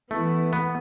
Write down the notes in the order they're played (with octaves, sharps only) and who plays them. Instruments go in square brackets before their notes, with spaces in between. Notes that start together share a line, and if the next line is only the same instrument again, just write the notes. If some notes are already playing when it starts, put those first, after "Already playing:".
[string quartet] E3 B3 E4 [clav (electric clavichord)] A3
[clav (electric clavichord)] B3